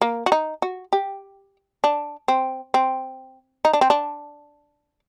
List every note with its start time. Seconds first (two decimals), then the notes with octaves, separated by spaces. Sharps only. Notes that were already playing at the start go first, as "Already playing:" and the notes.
0.02 A#3
0.26 F#4
0.32 D#4
0.62 F#4
0.93 G4
1.84 D4
2.28 C4
2.74 C4
3.65 D#4
3.73 D4
3.81 C4
3.90 D4